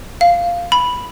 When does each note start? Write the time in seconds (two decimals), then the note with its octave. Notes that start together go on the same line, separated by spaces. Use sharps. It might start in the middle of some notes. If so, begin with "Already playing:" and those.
0.21 F5
0.72 B5